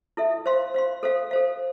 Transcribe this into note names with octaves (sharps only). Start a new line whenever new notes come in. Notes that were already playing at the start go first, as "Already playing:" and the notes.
E4 A4 E5
C5 F5 C6
C5 F5 C6
A4 C5 F5
A4 C5 F5